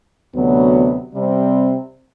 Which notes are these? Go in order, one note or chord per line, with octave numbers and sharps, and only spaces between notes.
D2 C3 F#3 B3
C3 G3 C4